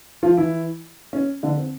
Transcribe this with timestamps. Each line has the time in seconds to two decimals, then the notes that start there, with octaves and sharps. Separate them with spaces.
0.23 F3 F4
0.37 E3 E4
1.13 C#4
1.43 D3 D4
1.57 C4